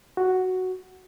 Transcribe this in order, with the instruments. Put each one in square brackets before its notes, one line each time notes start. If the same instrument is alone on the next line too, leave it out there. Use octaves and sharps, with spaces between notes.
[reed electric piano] F#4